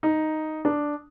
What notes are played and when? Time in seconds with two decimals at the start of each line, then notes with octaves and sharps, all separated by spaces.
0.03 D#4
0.65 D4